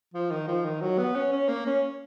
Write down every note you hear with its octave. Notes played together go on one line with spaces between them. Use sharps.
F3
D#3
F3
D#3
F#3
B3
C#4
C#4
A#3
C#4